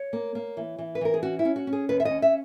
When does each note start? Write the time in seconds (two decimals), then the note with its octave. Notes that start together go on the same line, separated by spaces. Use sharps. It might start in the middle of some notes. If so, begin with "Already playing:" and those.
Already playing: C#5
0.13 A#3
0.35 A#3
0.57 E3
0.79 E3
0.95 B4
1.01 E3 A#4
1.14 G#4
1.23 C#4 F#4
1.39 E4
1.45 C#4
1.56 F#4
1.67 C#4
1.73 G#4
1.89 D#2 B4
2.00 E5
2.05 D#5
2.11 C#4
2.22 E5